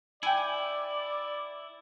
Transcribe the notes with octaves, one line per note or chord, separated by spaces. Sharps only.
E4 D5 G5 G#5